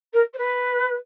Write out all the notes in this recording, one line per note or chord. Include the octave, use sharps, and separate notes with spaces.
A#4
C5
B4